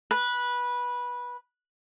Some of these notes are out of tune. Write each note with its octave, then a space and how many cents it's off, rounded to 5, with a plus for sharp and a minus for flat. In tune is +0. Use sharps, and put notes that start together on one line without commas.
B4 -15